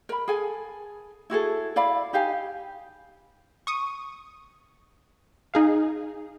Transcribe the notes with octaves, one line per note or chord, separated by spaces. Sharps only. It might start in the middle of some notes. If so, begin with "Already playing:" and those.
A#4 B5
G#4 A4 G#5
E4 F#4 G#4 A4
E4 D5 F5 B5
D#4 G4 F5 G#5
C#6 D#6
D#4 G#4 F5